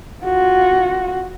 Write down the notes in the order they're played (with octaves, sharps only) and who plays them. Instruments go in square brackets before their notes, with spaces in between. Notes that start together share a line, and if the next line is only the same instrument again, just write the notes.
[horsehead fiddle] F4 F#4